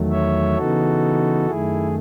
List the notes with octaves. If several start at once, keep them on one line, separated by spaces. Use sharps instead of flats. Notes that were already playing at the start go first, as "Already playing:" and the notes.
Already playing: E2 D#3 F#3 A3
C#5 E5
C#3 E3 B3 D#4 F#4 A4
F#2 D#3 A3 E4 G#4